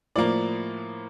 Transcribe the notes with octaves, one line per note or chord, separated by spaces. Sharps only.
A2 F3 A#3 D5